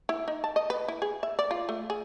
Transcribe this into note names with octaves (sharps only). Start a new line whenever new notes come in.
E4
D#4
A5
D#5
B4
E4
G#4
E5
D5
F4
A3
G#4